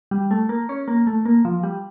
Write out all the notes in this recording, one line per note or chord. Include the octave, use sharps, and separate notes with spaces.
G3
A3
A#3
C#4
A#3
A3
A#3
F3
G3